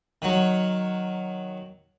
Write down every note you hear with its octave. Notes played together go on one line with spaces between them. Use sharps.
D#3 F#3